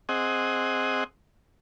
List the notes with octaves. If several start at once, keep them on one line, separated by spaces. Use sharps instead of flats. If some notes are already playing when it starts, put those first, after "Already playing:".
C4 G#4 D#5 F#5